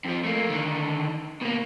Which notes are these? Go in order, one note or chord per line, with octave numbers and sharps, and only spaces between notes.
F2 F3
A3 A#3
D3 D#3
B2 A#3